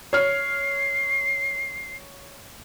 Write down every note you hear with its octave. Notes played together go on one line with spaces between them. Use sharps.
C#5 F6 C7